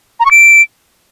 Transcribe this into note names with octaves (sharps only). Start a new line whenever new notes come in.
A#5
C#6
D7